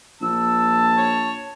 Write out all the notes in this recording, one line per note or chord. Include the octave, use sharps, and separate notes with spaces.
A#1 A5 E6
C#5